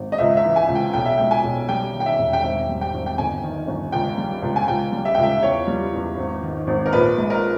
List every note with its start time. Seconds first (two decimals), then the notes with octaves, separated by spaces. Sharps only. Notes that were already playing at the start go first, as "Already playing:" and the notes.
Already playing: G#1
0.12 D#5
0.18 C#2 E5
0.37 E5
0.44 E3
0.56 G#5
0.68 C#2
0.75 G5
0.94 B1 G5
1.06 E5
1.18 G#3 G5
1.31 G#5
1.43 B1
1.69 G3 G5
1.93 D#3
2.00 G5
2.06 E5
2.19 E1
2.33 G5
2.43 G#1 E5
2.69 G3
2.81 G5
2.94 G#1
3.06 G5
3.18 G1 G#5
3.43 D#3
3.67 G1
3.92 C#2 G5
4.18 G3
4.42 C#2
4.56 G#5
4.68 C#2 G5
4.92 G3
5.05 E5
5.15 C#2 G5
5.23 E5
5.42 E2 C#5
5.67 G3
5.93 E2
6.17 G#1
6.43 D#3
6.67 G#1
6.86 A#4
6.92 A#1 B4
7.18 G#3
7.30 A#4